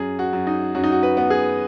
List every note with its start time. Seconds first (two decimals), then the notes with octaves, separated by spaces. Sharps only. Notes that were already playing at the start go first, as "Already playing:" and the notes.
Already playing: F#2 G#4
0.19 F#4
0.33 F#2
0.47 D#4
0.75 F#2 F#4
0.84 D#4
0.92 F#4
1.03 B4
1.17 B3
1.30 G#4